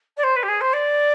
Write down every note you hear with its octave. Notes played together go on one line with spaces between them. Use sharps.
D5
C5
B4
G4
G#4
C5
D5